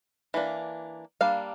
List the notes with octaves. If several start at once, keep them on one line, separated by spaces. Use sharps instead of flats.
E3 A#3 D4
G3 A#3 D4 F5